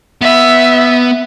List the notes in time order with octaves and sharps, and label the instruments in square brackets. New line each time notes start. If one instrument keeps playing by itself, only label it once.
[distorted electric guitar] B3 [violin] E5